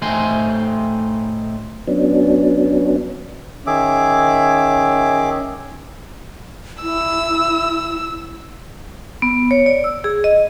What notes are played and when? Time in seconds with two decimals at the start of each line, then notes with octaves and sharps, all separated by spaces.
0.02 A2 A3 C4 D#4 G#5 C6
1.87 F#3 B3 C#4 D4
3.67 D#3 C#4 G#4 E5 D6
6.83 E4 E6
9.22 B3
9.51 C#5
9.66 D5
9.84 E6
10.04 G#4
10.24 D#5